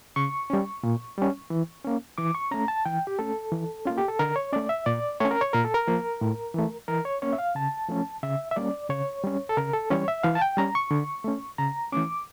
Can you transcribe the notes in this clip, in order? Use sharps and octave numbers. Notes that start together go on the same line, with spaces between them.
C#3 C#6
G3 C#4
A#2
G3 C#4
E3
A#3 C#4
E3 D6
C#6
A3 C#4 A#5
A5
E3 G5
G4
A3 C#4 A4
E3
A#3 C#4 F4
G4
A4
D3 A#4
C#5
A3 C#4 D5
E5
A#2 D5
A3 C#4 C#5
A#4
C#5
A#2 A#4
A4
A#4
F3 A#3
A2
E3 A3
E3 A#4
C#5
A#3 C#4 C#5
E5
F5
C#3 A5
F3 A3 C#4
C#3 E5
E5
G3 A#3 C#4 D5
C#3 C#5
G3 C#4
A4
C#3 A#4
A4
E3 G3 C#4 C#5
E5
E3 F5
A5
G5
G3 C#4 A#5
C#6
D3
A3 C#4
C#3 A#5
E3 A3 C#4 D6